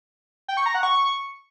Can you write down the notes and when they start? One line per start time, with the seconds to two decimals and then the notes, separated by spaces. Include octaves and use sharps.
0.48 G5
0.57 C#6
0.66 A#5
0.74 F#5
0.83 C#6